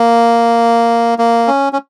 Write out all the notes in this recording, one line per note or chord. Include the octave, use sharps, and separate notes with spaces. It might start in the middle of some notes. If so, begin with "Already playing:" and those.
Already playing: A#3
A#3
C#4
C#4